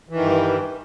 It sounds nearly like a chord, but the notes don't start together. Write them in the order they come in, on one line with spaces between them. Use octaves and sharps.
E3 D#3 G2